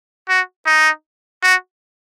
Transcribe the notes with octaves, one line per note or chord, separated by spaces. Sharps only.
F#4
D#4
F#4